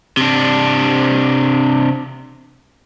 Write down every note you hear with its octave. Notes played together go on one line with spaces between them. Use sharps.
C3 D4